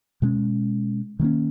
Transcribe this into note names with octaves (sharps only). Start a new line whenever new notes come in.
B2 G#3 C#4
D#3 F#3 A#3 C#4